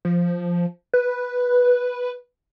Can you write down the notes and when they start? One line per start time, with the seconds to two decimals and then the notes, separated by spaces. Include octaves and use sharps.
0.05 F3
0.94 B4